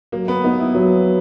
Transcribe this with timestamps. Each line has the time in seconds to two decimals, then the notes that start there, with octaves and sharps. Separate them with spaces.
0.12 F#3 A#3
0.28 B3
0.44 B3 D#4
0.59 E4
0.75 F#3